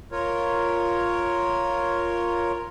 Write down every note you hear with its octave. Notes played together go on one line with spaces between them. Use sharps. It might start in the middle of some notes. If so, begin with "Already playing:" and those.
F4 A#4 C#5